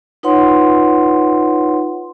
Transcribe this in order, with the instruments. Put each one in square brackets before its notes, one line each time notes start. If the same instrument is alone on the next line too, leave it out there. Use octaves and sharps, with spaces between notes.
[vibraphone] D#4 F4 B4 C#5 F#5 C6